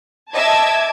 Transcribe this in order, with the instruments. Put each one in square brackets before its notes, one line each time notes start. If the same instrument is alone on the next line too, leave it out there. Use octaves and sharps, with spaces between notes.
[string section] D#5 E5 E6 [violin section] A5 D6 G#6